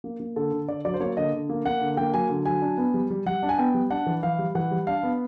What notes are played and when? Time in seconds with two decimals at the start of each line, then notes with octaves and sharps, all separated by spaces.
0.04 A#3
0.20 A#3
0.36 D3 A4
0.52 D3
0.68 D3 D5
0.85 F#3 D5
0.94 C5
1.01 A#3 C#5
1.17 D3 D#5
1.33 D3
1.49 A#3
1.65 A#3 F#5
1.81 D3
1.97 A#3 G5
2.13 F#3 G#5
2.30 D3
2.46 F#3 G#5
2.62 D4
2.78 B3
2.94 G3
3.10 G3
3.26 G3 F#5
3.43 D4
3.49 G#5
3.58 B3 G5
3.74 G3
3.90 D4 F#5
4.06 E3
4.23 E3 F5
4.39 G3
4.55 E3 F#5
4.71 G3
4.87 D4 F5
5.03 B3